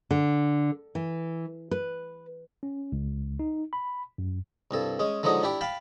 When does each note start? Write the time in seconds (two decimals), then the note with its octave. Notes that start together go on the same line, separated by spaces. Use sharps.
0.11 D3
0.95 E3
1.71 B4
2.63 C#4
2.92 C#2
3.39 D#4
3.73 B5
4.18 F#2
4.71 C2 G2 A4
4.99 G#3 C#4
5.23 D3 F3 F#3 G#3 D#4
5.43 D4 E4 G4 D6
5.61 F5 G5 A5 B5